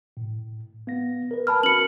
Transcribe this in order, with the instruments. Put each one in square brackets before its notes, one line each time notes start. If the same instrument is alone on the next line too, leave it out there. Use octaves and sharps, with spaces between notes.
[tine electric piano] A2
B3 F5 A#6
A#4 B4
[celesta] A5 B5 F6
[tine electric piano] C#4 F#4 A#4 [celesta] C#7 F#7